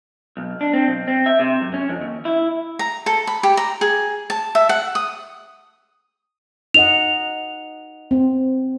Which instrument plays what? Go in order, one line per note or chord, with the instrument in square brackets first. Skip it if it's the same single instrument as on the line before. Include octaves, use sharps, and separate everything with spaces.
[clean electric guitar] B1
D4
C4
B1
C4
E5
C3
F#2
C#4
F2
D#2
E4
[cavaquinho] A#5
A4
B5
G4
A#5
G#4
A5
E5
F#5
D#6
[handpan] D#4 D#5 F#5 [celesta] F7
[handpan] C4